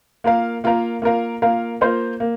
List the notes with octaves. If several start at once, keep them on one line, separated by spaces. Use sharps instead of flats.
A#3 F4 A#4 F5
A#3 F4 A#4 F5
A#3 F4 A#4 F5
A#3 F4 A#4 F5
A#3 F4 C5
A#3